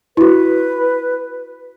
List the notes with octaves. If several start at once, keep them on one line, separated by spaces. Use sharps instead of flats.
E4 F#4 B4